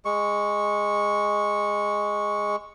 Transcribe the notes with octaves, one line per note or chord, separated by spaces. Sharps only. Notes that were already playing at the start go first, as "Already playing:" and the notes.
G#3 C#6